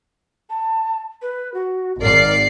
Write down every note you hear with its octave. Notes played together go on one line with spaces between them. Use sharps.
A5
B4
F#4
G#1 A#4 D5 C7